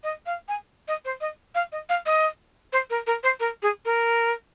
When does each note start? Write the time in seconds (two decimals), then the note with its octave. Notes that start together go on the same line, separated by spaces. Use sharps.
0.04 D#5
0.26 F5
0.48 G#5
0.88 D#5
1.05 C5
1.21 D#5
1.55 F5
1.72 D#5
1.89 F5
2.06 D#5
2.73 C5
2.90 A#4
3.07 A#4
3.23 C5
3.40 A#4
3.63 G#4
3.85 A#4